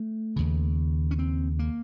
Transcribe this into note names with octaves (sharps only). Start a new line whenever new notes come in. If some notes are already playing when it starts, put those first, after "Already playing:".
Already playing: A3
D#2 C#3
C#4
C4
A#3